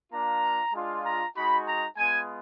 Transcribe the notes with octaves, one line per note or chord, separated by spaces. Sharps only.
A#3 D4 F4 A#5
G#3 D4 F4
A#5
G#3 D#4 F#4 B5
A#5
G#3 B3 F4 G#5